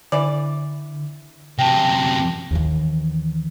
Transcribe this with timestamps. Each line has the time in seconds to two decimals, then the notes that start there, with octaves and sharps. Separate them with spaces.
0.12 D3 E3 D5
1.59 F#2 C3 G5 A5 A#6
2.51 D#2 E3